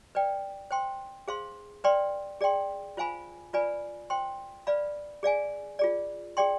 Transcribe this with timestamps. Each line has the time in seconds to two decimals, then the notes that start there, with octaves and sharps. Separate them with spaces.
0.15 B4 D5 G5
0.71 C5 G5 C6
1.28 G#4 C5 F5 C6
1.84 B4 D5 G5 C6
2.41 G#4 D5 G5 C6
2.97 F4 C5 F5 G#5 B5
3.53 F4 B4 D5 G#5 B5
4.10 C5 G5 C6
4.67 B4 D5 F5 B5
5.23 G#4 D5 F5 G#5
5.79 F4 G#4 D5
6.37 G#4 D5 G5 C6